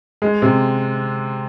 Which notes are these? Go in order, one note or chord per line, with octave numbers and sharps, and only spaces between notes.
G#3
C3